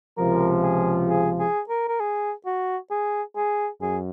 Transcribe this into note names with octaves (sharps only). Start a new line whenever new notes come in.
C#2 C3 F3 A#4
G#4
G#4
G#4
A#4
A#4
G#4
F#4
G#4
G#4
F#2 G#4